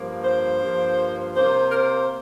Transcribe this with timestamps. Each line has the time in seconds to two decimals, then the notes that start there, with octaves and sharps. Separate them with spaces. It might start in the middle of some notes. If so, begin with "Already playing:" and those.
Already playing: G2 F3 A#3
0.22 C5
0.60 G2 F3 A#3
1.34 C3 A#3 C5
1.69 A#4
1.72 C5